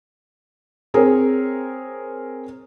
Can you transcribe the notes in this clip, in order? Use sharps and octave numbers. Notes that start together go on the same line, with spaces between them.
C4 G#4 A#4 C#5